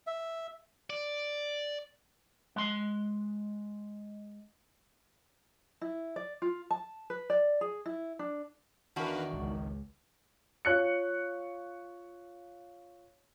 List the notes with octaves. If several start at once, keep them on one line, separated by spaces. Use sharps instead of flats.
E5
D5
G#3 C6
E4
D5
F4
A5
B4
D5
G#4
E4
D4
E2 D#3 D4 F#4 A#4 B4 F5
G#1 C#2
F4 C#5 F#6 C#7